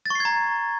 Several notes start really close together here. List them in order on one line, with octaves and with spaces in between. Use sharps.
A6 C#6 C7 G#6 A#5